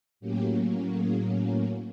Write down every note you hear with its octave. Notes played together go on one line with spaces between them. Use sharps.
A2 F#3 A#3 C#4 G4
G#4